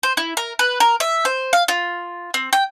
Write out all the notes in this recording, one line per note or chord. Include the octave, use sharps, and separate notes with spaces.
C5
E4
A#4
B4
A#4
E5
C5
F5
F4
C4
G5